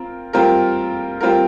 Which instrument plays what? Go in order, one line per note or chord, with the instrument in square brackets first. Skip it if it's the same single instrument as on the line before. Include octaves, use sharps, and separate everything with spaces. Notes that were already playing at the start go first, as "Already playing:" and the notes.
Already playing: [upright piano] C4 F4 A#4
G3 C4 F4 A#4
G3 C4 F4 A#4